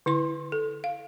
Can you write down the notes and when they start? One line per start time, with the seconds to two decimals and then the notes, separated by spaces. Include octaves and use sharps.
0.06 D3 E4 C6
0.52 A4
0.84 F5